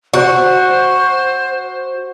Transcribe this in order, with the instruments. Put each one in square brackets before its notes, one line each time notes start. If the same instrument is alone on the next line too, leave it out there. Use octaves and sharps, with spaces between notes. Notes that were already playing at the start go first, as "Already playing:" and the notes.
[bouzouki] F#4 [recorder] C5